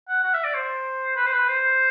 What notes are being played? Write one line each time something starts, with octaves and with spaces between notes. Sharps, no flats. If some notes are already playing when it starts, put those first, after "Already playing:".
F#5
F#5
E5
D5
C5
B4
C5
B4
C5